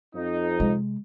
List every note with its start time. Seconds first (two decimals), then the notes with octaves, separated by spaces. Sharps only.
0.15 F2 D#4
0.60 C3 G#3